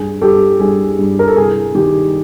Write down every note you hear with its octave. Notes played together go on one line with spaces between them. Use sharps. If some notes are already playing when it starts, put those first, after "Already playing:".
Already playing: G2 G#4
G2 G4 A4
G2 G#4
G2
A#4
A4
C2 G#4
D#3 G4